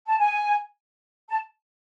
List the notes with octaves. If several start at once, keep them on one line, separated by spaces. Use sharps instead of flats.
A5
G#5
A5